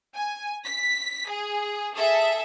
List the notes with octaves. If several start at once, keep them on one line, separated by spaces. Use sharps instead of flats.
G#5
B6
G#4
G#4 A4 E5